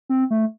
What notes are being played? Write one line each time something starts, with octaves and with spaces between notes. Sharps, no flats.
C4
A3